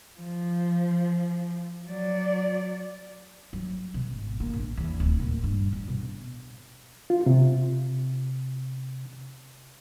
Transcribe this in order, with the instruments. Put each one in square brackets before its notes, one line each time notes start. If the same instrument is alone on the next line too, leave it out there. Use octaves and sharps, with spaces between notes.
[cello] F3
F#3 D5
[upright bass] F#3
B2
G#1
A#3
A#1
E2
D1
A#2
G2
G2
B2
[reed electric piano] F4
C3